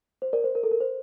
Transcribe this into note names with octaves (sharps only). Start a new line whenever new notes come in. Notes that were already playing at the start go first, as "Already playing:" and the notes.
C5
A#4 D5
C5
A#4
A4
A#4
C5